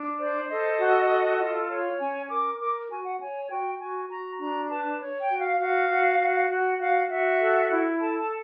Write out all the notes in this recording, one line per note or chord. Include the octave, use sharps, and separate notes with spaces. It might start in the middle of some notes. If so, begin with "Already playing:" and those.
Already playing: D4
C5 D5
A4 D#5
F#4
A4
F4
C#5
C#4 G#5
A#4 D6
A#4 D6
F#4 G#5
F#5
C#5 G#5
F#4 G5
F#4 G#5
F#4 A#5
D4 A#5
B4 A5
C#5
G5
F#4
F5
F#4 F5
F#4
F#4
F#4
F#4 F5
F#4 E5
A4
E4
A4 A5
A5